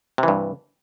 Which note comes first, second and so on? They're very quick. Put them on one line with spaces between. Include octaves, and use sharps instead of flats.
C3 E3 G2